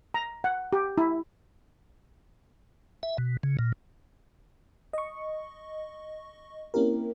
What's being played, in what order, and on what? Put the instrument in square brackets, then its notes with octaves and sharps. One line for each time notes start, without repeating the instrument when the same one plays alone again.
[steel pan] A#5
F#5
G4
E4
[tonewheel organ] E5
B2
C#3
A#2
[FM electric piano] D#5 C#6
A#3 C4 C#4 E4 G4 A#4